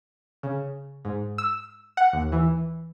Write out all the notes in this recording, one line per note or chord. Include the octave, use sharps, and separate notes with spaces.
C#3
G#2
E6
F#5
D#2
E3